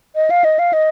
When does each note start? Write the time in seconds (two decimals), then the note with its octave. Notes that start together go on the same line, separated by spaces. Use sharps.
0.16 D#5
0.30 F5
0.44 D#5
0.59 F5
0.73 D#5